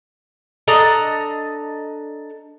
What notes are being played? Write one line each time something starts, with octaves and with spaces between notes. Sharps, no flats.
D4 A4 D#5 A#5